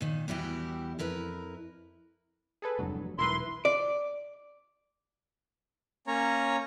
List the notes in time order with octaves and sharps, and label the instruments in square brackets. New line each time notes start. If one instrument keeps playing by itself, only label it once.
[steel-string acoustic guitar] A#2 D#3
E2 E3 G3 E4 F#4 G4
F2 E4 A#4 B4
[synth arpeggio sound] G#4 A4 B4
[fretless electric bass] F1 G2 [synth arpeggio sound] E2 F#3
[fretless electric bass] E1 B1 [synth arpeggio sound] E4 A#4 B4 [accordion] C6
[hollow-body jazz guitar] D5
[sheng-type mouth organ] A#3 C#4 C#5 A#5